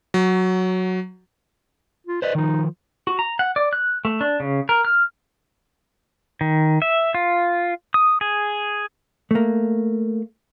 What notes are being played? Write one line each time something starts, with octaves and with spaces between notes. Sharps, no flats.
F#3
F4
B4 C5 D5 D#5
D#3 F3 D#4
F#4
A#5
F#5
D5
F#6
A3
D4
C#3
A#4
F6
D#3
E5
F4
D#6
G#4
A3 A#3